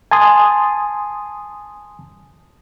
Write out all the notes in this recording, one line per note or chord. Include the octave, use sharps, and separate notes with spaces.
G#5 A5 C6 D#6